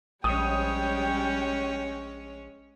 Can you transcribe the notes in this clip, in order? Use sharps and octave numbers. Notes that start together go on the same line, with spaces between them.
A#1 G3 G#3 C#4 C#5 G5 D#6